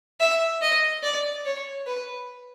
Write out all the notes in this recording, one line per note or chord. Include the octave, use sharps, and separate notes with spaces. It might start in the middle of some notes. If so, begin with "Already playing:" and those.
E5
D#5
D5
C#5
B4